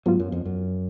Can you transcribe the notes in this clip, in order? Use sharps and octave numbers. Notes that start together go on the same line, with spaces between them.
G#2 F#3 B3 F4
F#2
F2
F#2